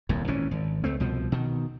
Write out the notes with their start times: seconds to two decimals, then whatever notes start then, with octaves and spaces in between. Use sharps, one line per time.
0.09 D#1 C2 F2
0.28 G#1 A#2 E3 C#4
0.51 G#1
0.84 C#2 A3 C4
1.00 C2 B2 F3
1.32 B2 D#3